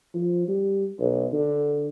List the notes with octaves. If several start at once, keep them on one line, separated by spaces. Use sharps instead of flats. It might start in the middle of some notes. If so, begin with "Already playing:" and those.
F3
G3
B1
D3